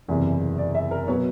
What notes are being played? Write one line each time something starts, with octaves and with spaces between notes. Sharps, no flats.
F#1 E2 C3 E3
D5
E5
A#4
B2 F#3 B3 C#5